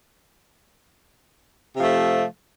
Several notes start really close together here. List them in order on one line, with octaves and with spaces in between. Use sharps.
C3 F3 A3